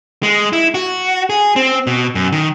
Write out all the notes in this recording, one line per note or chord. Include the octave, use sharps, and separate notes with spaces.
G#3
E4
F#4
G#4
C4
B2
F#2
D#3